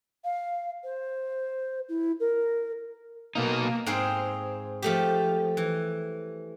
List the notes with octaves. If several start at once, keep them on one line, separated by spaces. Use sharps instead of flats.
F5
C5
E4
A#4
B2 A#3 D#4
G#2 C4 G#4 F5 G5
F3 A3 G4
E3